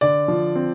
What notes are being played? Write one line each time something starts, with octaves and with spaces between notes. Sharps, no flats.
D3 D5
F3
C4